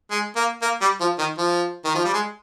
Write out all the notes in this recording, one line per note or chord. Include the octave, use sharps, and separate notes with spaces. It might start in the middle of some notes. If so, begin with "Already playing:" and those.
G#3
A#3
A#3
G3
F3
D#3
F3
D#3
F3
G3
G#3